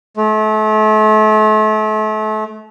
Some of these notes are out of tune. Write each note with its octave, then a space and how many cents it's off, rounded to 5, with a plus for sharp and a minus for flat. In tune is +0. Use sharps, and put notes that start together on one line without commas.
A3 -35